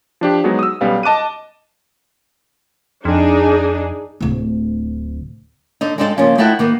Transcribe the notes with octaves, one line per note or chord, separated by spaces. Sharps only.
F3 D4 G4
F#3 G#3 B3 D#4 F#4 G#4
D#6 E6
B1 G3 B3 C#4 F5
D#5 A5 D6 F#6 D#7
F2 D4 D#4 G#4
D1 D2
D3 D#4
G#3 C4 D4 D#4 F#4 A4
C#3 F3 A#3 C#4
A3 D#4 E4 A4 F#5 G5
D#3 A#3 B3